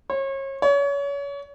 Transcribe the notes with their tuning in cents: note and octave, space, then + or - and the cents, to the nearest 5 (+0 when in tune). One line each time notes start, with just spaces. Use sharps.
C#5 -35
C#5 +30